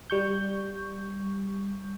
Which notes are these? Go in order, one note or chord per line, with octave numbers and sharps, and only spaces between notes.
G3 C#6 G6